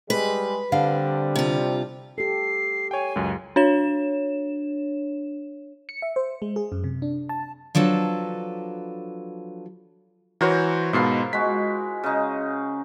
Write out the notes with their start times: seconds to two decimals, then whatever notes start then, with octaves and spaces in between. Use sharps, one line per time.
0.10 G3 G#3 B4
0.72 D3 G3 C4 D4 F5
1.36 C3 F4
2.18 G4 A4 C7
2.91 C#5 G5 G#5
3.16 C#2 F#2
3.56 D4 C#5 E7
5.89 C#7
6.02 E5
6.16 C5
6.42 G#3
6.56 G#4
6.72 F#2
6.84 C3
7.02 D4
7.29 A5
7.75 F3 F#3 D4 A4 B4
10.41 E3 F#4 A#4 C5 C#5
10.93 G#2 B2 E4 F4 A#4 C7
11.33 G#3 F#4 B6
12.04 C#3 D#4